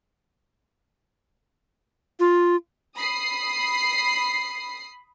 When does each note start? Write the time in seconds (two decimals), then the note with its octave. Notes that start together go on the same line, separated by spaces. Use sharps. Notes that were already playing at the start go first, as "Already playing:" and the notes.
2.20 F4
2.97 B5 D#6 C7